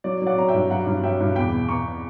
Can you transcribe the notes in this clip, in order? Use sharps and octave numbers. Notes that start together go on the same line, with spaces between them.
F#3 D5
F#3 D5 F#5
F#3 A#5
E5 G5
G2
F#3 F#5 A#5
G2
F#3 E5 G5
G2
E2 G5 B5
B2
B2 A#5 C#6